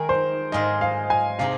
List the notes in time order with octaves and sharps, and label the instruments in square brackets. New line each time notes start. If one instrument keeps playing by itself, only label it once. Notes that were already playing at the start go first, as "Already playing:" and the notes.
Already playing: [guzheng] D#3 G#3 D#4 G#4 [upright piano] A#4
[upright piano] C5
[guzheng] G#2 G#3 F4 G#4 [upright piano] D#5
[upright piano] F5
G#5
[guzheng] C3 G#3 D#4 G#4 [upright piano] F5